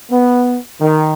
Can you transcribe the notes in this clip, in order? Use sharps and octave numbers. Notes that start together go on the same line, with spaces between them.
B3
D#3